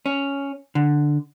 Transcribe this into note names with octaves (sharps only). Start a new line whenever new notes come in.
C#4
D3